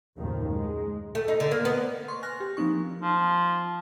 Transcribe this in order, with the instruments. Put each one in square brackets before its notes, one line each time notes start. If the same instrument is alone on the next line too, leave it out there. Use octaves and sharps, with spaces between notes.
[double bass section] F#1 D#2 A2 D#3 F3
G#3
[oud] A3
D#4
D3
A#3
B3
[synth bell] C6 C#6
G#5 F6 F#6 A#6
G4
F3 A#3 C4 D#4 C#6
[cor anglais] F3